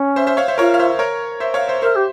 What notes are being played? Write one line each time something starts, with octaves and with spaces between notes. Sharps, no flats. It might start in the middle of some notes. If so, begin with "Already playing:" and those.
Already playing: C#4
C5 E5
C5 E5
C#5 F5
C5 E5
F4 A#4 C#5
F5
C5 E5
A#4 C#5
C5 E5
C#5 F5
C5 E5
A#4 C5 E5
G4